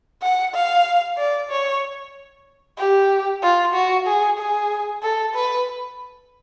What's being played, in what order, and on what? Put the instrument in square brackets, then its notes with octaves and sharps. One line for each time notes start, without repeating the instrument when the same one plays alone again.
[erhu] F#5
F5
D5
C#5
G4
F4
F#4
G#4
G#4
A4
B4